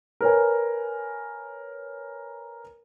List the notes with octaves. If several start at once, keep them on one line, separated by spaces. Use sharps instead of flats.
A#4 B4 C#5 G#5